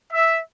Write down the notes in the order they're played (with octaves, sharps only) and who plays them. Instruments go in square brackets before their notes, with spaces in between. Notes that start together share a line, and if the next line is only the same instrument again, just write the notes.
[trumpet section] E5